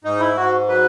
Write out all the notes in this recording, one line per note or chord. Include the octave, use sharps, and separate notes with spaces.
G#2 D#4
E4
G#2 F#4
F#3 B4